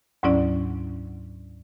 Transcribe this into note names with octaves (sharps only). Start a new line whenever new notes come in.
D2 G#2 F#3 C#4 E4 D5